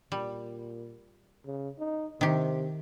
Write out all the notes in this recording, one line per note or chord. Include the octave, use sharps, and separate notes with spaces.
A#2 G3
C#3
D#4
C3 D#3 G4